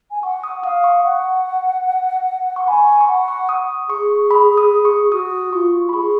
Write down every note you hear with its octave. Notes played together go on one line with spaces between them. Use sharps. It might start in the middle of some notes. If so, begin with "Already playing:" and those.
G#5
F#5 C#6
D#6
F5 D#6
C#6
F#5
C#6
G#5 B5
C#6
C#6
F#5 B5
C#6
D#6
G#4 C#6
B5
D#6
C#6
F#4 D#6
F4 C#6
B5
G#4 C#6